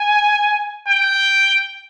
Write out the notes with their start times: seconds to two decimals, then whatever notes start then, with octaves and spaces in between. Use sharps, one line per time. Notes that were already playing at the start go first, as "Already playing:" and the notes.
Already playing: G#5
0.88 G5